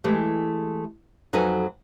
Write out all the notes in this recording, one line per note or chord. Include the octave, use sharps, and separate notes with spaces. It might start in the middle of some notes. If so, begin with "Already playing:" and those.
E3 G#3 A3 G4
F2 F#3 D#4 A4 B4 G#5